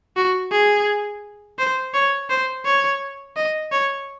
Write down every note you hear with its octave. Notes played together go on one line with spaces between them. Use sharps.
F#4
G#4
C5
C#5
C5
C#5
D#5
C#5